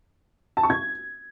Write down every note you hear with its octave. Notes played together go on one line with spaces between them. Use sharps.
A5
C#6
G#6